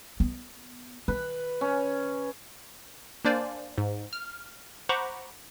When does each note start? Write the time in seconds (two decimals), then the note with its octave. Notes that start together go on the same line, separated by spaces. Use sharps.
0.20 B3
1.08 D#3 B4
1.61 C#4
3.25 A#3 D4 C5 D5 F5 G#5
3.78 G#2
4.13 F6
4.89 C5 F#5 A#5 B5 C#6 D6